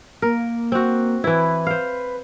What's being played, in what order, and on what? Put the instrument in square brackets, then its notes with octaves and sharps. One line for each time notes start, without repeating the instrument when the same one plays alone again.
[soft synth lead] A#3 [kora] A#4
[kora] C4 F#4
[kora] E3 E4 [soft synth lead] B4
[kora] C5 F5